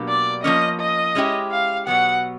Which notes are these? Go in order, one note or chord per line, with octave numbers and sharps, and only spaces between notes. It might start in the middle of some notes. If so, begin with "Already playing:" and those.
Already playing: B2 F#3 A#3 D4 G4
D5
F3 A#3 C#4 D#5
D#5
G#3 C#4 E4 G4
F5
B2 F#3 B3 F#5